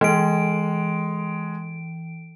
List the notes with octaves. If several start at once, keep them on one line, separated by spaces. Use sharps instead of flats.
E3 G#3 D7